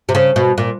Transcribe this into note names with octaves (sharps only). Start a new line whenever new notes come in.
C3
C#3
B2
A#2